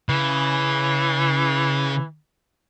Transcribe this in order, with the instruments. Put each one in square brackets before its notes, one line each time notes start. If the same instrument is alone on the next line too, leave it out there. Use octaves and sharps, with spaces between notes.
[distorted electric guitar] C#3 [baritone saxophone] E3